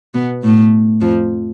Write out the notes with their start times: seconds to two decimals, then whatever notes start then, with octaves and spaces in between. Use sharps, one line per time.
0.14 B2 B3
0.43 A2 A3
1.01 F2 F3